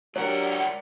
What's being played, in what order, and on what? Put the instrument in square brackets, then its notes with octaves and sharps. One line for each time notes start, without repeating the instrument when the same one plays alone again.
[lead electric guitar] C#2 F#5 [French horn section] F#3 D4 G4 [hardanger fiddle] A#4 D5 [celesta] C#5